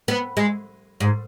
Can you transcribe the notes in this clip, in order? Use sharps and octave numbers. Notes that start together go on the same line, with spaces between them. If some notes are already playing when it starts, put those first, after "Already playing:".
B3
G#3
G#2